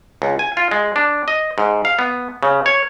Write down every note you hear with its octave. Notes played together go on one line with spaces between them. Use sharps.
C#2
G#5
F4
G#3
D4
D#5
G#2
F5
B3
C#3
C#5